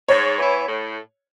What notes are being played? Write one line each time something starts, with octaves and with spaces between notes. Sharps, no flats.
G#2 C#5
E3 B3 E4
A2